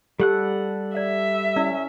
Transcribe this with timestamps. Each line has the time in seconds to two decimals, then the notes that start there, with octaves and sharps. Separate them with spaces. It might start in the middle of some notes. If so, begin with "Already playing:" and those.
0.20 G3 G4 A4 F#5 F#6
0.97 D5 E5
1.56 C#4 E4 D5 E6